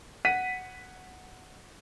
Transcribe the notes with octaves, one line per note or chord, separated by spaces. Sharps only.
F#5 B6 D#7